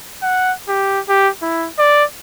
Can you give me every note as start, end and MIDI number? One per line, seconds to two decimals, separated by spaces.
0.22 0.53 78
0.69 1.00 67
1.09 1.29 67
1.42 1.68 64
1.78 2.04 74